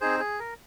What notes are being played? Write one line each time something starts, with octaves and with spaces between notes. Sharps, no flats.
C4 D#4 G#4 C5
G#4
A#4